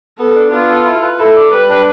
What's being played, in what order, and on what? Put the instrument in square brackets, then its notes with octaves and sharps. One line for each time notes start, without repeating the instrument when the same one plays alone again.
[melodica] B3 [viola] A4
[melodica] D4
[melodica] B3 [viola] F4
[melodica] A4
E4
B4
[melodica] E4 [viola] A4
[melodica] D5
[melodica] G3 [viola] B4
[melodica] D4